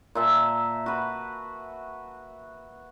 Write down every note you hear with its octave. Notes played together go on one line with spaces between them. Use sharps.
A#2 E5 A5
F#4 B4